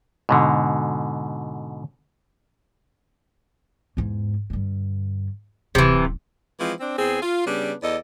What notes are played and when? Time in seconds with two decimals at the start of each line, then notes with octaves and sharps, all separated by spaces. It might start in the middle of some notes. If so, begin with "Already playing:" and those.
0.29 G#2 B2 D3
3.97 E2 G#2
4.50 G2 D3
5.75 D1 C3 E3
6.59 E3 F3 G#3 C4
6.80 C4 D4
6.97 E2 C4 G#4
7.21 F4
7.45 C#3 G3 B3 D4
7.82 E2 A4 D5 D#5